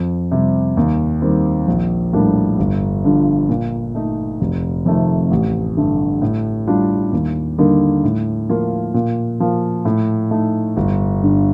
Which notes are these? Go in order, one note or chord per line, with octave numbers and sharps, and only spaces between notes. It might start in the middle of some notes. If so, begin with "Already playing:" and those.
Already playing: F2
C3 G3
D#2
D#3 G3 C4
A#1
A2 G3 A#3 D4
G1
G2 D3 F3
A#2
A3 D#4
F1
F2 C3 D#3 A3
A1
G2 D3 A3
A2
G3 D4 F4
D#2
D3 G3 A#3 D#4
A2
F3 A#3 F4
A#2
F3 A#3
A2
A3 D#4
G1
G2 D3